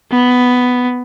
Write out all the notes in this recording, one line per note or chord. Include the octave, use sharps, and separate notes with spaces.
B3